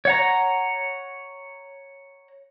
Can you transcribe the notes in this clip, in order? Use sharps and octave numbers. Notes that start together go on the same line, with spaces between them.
C#5 F#5 A#5